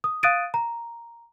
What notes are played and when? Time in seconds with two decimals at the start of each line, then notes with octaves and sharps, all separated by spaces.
0.04 D#6
0.23 F5 D#6 F#6 A6 D7 D#7
0.54 A#5